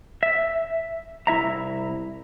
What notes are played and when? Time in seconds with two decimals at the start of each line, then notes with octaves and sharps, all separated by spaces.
0.23 E5
1.27 C2 E4 E5 A#5